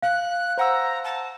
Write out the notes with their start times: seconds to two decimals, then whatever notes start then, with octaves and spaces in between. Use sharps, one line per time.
0.02 F5 F#6
0.58 C5 F#5 A#5 E6
1.04 A5